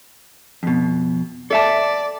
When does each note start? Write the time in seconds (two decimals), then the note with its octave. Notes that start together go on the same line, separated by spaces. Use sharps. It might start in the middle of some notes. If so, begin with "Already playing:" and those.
0.63 F2 B2
1.51 A4 D5 E5 A5